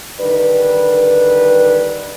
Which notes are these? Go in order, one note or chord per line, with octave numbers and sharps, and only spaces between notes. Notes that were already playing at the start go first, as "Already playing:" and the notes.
D3 D#3 G3 B4